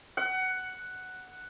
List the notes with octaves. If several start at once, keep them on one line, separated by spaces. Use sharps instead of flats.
F#5